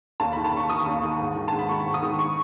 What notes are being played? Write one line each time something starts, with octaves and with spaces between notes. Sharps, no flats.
D#2 A5
B5
D#3
A5
D#2 C#6
D#3 D#6
D#2
D#3
G#2
D#3
G#2 A5
B5
D#3 C#6
G#2
D#6
D#3
C#6